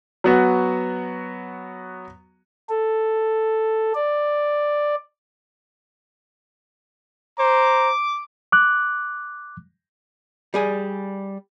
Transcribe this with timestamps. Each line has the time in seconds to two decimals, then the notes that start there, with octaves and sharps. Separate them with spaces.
0.24 F#3 B3 F#4
2.69 A4
3.94 D5
7.39 C5 A#5 D6
8.52 D6 F#6
10.54 G3 G#4 G#5